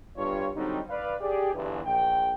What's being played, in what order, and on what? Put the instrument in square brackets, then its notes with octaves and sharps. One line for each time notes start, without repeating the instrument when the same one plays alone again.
[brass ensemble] G1 G2 F4 C#5
D3 F#3 G3 C4 D#4
B4 D5 F5
G4 G#4 D5
G1 E2 G2
A#1 G5